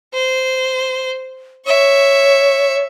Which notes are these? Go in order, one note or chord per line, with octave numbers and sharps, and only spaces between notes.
C5
C#5 E5 C#6